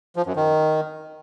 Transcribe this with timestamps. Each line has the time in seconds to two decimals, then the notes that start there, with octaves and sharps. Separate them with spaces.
0.16 F3
0.26 F#2
0.36 D#3